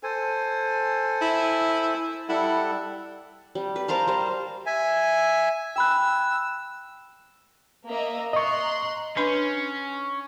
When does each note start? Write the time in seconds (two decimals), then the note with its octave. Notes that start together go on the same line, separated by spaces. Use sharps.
0.03 A4 C5 G#5
1.21 E4
2.29 G3 E4 A4 F#5
3.55 G3
3.76 B4
3.88 A#4 C5 F5 A5
4.08 G3 C5
4.66 E5 G#5
5.76 G5 B5 E6 F#6
7.88 A#3 D#5 E5
8.33 D#5 A#5 C6 C#6 F#6
9.17 C#4 D4 B4 C6